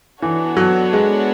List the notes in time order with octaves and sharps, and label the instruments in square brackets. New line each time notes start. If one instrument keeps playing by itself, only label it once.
[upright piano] E3 [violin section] B3 D4 F#4 A4 C#5
[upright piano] F#3
G#3